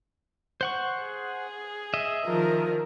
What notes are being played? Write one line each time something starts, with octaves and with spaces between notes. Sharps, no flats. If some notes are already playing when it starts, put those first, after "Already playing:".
C5 F#5 C#6
G#4
D#5 E5
D#3 F3 A#4